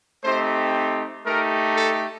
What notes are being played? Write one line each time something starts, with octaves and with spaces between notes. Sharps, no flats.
A3 C4 D#4 G4 C5
A3 D#4 G4 A#4
A4